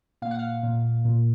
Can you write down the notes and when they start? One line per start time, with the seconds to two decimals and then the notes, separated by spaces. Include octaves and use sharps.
0.22 A#2 F5
0.31 F#5
0.39 F5
0.63 A#2
1.05 A#2